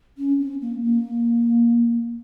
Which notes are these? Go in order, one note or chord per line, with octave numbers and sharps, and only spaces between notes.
C#4
C4
A#3
A#3